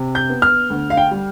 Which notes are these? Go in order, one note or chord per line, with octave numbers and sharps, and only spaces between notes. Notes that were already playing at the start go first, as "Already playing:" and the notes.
Already playing: C3
G6
B3
F6
D2
F5
G5
G3